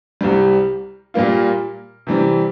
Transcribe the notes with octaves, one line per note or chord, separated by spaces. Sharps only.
C2 C3 G3
A#2 G3 A#3 F4
C3 E3 G3